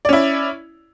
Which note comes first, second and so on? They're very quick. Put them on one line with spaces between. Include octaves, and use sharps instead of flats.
D5 C#4 E4